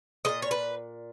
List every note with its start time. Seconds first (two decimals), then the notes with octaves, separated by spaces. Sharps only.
0.25 G#3 D#5
0.28 A#2
0.42 C#5
0.51 B4